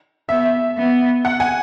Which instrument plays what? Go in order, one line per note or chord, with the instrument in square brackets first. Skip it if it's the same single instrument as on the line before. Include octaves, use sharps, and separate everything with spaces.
[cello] B3 [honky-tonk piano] E5
[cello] B3
[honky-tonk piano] F#5
G#5